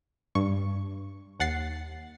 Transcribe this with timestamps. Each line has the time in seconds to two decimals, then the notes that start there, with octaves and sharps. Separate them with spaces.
0.35 G2 C#6
1.40 D#2 F#5 A6 C7